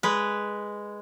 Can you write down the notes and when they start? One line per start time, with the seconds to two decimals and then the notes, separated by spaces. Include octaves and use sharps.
0.03 G#3 B4